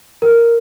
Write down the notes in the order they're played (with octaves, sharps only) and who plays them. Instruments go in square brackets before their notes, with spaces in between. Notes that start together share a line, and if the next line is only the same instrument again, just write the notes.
[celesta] A#4